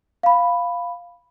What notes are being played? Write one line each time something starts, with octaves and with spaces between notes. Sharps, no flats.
F5 B5